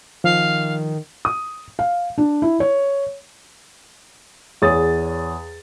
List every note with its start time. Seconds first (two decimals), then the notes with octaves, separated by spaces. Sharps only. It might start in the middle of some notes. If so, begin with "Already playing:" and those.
0.24 D#3 F3 F5
1.25 D#6
1.79 F5
2.18 D4
2.42 E4
2.60 C#5
4.62 E2 G#4 C#5 D#6 A6